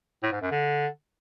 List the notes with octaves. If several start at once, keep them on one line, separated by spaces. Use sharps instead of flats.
A2
G#2
F#2
D3